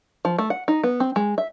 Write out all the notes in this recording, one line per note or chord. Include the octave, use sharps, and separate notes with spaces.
F3
A3
F#5
D#4
B3
C4
G#3
E5